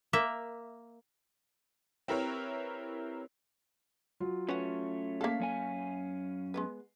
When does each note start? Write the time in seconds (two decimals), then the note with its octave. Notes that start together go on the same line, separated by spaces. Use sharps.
0.13 A#3 E5
2.08 C4 E4 G4 A#4 B4 C#5
4.20 F#3 F4
4.49 A3 C#4 B4 C#5 F#5
5.21 A#3 A4 F5 B6
5.40 F#2 C#4 G#5
6.54 G#3 B3 B4